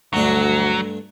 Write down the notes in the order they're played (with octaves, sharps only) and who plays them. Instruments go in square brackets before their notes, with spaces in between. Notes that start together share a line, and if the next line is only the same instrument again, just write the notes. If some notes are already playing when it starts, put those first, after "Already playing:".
[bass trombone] D2 [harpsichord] G2 A3 D4 [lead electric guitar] F#3